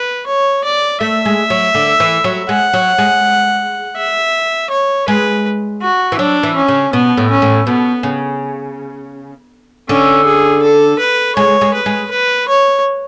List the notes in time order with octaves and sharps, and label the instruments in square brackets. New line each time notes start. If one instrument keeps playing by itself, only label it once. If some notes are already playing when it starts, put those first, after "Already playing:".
Already playing: [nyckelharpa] B4
C#5
D5
[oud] A3 [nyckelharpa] E5
[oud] G#3
F#3
D3
E3
F#3
[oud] G#3 [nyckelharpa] F#5
[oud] F#3
G#3
[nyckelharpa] E5
C#5
[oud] G#3 [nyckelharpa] B4
[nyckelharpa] F#4
[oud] E3
[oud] F#3 [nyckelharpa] D4
[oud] E3
[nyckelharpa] C#4
[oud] C#3
[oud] B2 [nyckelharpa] B3
[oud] A2
[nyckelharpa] C#4
[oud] A2
[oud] B2 [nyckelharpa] B3
[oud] C#3
[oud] D3 [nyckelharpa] C#4
[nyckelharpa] G#4
A4
B4
[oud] G#3 [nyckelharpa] C#5
[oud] G#3
[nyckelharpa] B4
[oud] G#3
[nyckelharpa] B4
C#5